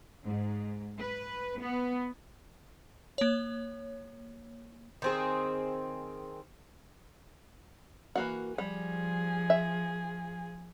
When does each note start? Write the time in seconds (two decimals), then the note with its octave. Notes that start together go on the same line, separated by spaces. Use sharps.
0.24 G#2
0.97 B4
1.60 B3
3.18 A#3 C#5
5.02 D#3 C4 G#4
8.15 E3 A#3 F#4
8.58 F3 G3 G#4
9.50 E5